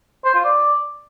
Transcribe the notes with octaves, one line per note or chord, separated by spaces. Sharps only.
C5
F4
D5